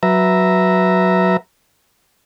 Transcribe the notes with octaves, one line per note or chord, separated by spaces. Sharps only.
F#3 B4 E5 A#5